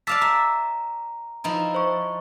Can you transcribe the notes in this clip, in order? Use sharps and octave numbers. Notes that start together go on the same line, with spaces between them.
D5 F5 A5 D6 E6 B6
E5 A#5
F3 D#4 E4
C5 C#6